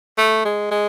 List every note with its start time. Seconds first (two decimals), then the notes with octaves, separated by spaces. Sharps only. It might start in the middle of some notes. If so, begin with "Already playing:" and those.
0.18 A3
0.45 G#3
0.71 G#3